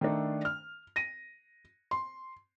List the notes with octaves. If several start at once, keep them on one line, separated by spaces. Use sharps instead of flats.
D#3 A3 D4 A4
F6
A#6 D#7
C6